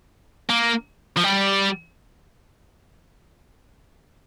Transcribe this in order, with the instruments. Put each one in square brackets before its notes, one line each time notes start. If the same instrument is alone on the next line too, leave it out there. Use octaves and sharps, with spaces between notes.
[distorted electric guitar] A#3
F3
G3